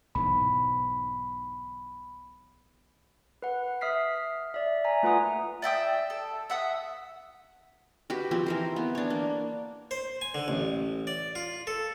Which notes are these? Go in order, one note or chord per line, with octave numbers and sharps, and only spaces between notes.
B1 G#2 E3 B5
B4 F#5
E5 D#6 F6 B6 C7
D5 E5
E5 G#5 A#5
A3 F4 B4 F#5 G#5 D#6
D5 E5 G5 D#6
A4
E5 F#5 D#6
F#4 G4 B4
F3 C4
E3 A#4 C5
B3
D4 C#5
A#3
C5
G#5
D3
A1
D5
F4
A4